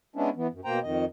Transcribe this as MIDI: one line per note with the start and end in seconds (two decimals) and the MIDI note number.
0.16 0.30 56
0.16 0.30 59
0.16 0.30 61
0.16 0.30 62
0.16 0.30 64
0.36 0.47 52
0.36 0.47 59
0.52 0.61 42
0.65 0.79 47
0.65 0.79 58
0.65 0.79 72
0.65 0.79 79
0.65 0.79 82
0.83 1.05 41
0.83 1.05 51
0.83 1.05 75